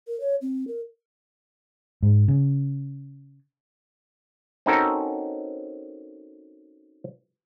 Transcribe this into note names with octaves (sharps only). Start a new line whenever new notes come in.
A#4
C#5
C4
A#4
G#2
C#3
C4 C#4 D#4 F#4 A4 A#4